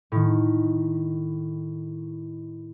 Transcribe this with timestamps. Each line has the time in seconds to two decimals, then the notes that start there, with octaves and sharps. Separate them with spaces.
0.12 A2 D#3